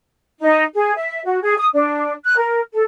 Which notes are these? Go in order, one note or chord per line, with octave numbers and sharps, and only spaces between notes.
D#4
G#4
E5
F#4
G#4
D#6
D4
F#6
A#4
A4